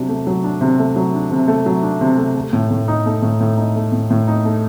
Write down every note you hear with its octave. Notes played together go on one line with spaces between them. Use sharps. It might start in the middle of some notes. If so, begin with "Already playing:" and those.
Already playing: C3 F#3 D4
A3
F#3
D4
C3
A3
F#3
D4
C3
A3
F#3
D4
C3
A3
A3
A2
A2
D#4
A3
A2
A2
D#4
A3
A2
A2
D#4
A3